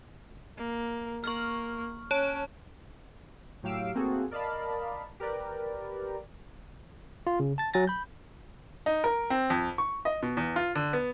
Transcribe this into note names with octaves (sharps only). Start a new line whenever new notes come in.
A#3
A#3 C#6 F6
C#4 C#5 A5
A2 F#3 G4 F5 E6 D7
A3 A#3 C4 F#4 G#4 A4
A#4 D5 D#5 F5 A5 B5
G4 A#4 B4 D5
F4
C#3
A5 A6
F#3 G#5 A6 A#6
B5 G6
D#4
A#4
C4
F2
C#6
D#5
B2
E2
F4
D3
B3